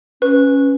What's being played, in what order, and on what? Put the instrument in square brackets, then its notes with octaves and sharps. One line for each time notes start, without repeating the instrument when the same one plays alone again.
[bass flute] C#4 [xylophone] B4